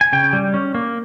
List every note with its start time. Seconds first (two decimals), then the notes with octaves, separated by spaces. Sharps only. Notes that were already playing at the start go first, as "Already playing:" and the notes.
0.01 G#5
0.13 C#3 G5
0.33 G3
0.54 C#4
0.75 A#3